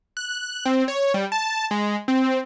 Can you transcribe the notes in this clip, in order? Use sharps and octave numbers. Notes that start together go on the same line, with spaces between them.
F#6
C4
C#5
G3
A5
G#3
C4